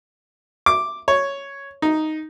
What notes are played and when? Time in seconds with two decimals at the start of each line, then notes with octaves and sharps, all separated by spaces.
0.66 D6
1.08 C#5
1.82 D#4